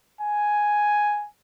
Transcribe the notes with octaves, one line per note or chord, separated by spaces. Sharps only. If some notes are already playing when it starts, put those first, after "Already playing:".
G#5